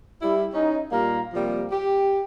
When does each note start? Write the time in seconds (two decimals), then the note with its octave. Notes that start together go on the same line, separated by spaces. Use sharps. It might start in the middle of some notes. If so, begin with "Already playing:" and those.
0.22 G3 E4
0.53 C#4 D#4
0.91 A#2 G3 A#3 F5 A#5
1.33 C3 F3 G3 A#3
1.71 G4